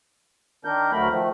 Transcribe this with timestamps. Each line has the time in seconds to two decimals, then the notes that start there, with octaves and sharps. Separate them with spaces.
0.65 D#3 D4 A#4 G6
0.92 D2 F#3 A3 A#4 B5
1.10 D#3 F3 A3